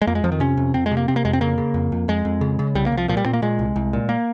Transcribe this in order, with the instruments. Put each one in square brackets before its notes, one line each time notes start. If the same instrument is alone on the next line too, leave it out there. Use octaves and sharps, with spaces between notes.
[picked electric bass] G#3
F2 A#3
G#3
F2 F3
D#3
C3 C#4
F2
F2 C4
G#3
C3
A#3
C3 C4
A#3
F2 G#3
C4
C#3 A#3
C#3
F2
F2
F2 G#3
F2
C#3
C#3
C2 G3
A#3
C2
F3
A#2 F3
G3
A#2 C4
A#3
A#2 G#3
C2
C2
A#2
A#3